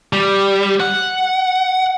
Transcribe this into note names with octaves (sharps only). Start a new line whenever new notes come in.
G3
F#5